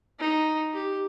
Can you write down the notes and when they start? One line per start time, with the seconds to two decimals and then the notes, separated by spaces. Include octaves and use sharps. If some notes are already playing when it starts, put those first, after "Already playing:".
0.19 D#4
0.74 G4